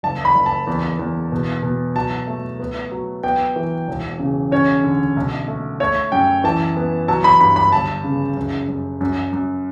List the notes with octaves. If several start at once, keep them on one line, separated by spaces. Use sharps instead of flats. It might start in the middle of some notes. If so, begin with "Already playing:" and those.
F#1 A5
B5
F#1
A5
E2
E2
B2
B2
F#3 A5
A3
B3
F#3
B3 G5
E3
E1
C#3
C#4 C#5
D3
B1
A3
A3 C#5
F#2 G5
E3 A5
B3
F#3 A5
B5
G2 B5
B5
G1 A5
C#3
F#2
F#2
F#2
F#2